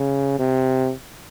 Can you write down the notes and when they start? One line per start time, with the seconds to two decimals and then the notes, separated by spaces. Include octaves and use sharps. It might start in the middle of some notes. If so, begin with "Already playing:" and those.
Already playing: C#3
0.39 C3